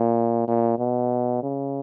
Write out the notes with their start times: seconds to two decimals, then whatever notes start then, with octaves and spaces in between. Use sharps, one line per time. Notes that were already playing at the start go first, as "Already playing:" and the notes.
Already playing: A#2
0.48 A#2
0.79 B2
1.43 C#3